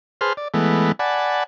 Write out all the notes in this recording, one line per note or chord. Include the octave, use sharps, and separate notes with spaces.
G#4 B4 C5 A5 C6 F6
D5
E3 G#3 A3 B3
D5 F#5 G#5 A5 B5